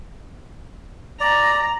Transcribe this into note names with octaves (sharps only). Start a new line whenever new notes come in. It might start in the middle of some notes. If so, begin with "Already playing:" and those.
D5 A#5